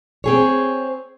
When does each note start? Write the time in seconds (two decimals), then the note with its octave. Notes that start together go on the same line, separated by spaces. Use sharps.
0.24 C4 G#4 C#5